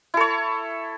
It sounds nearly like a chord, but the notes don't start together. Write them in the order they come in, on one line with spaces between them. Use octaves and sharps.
E4 A4 C#5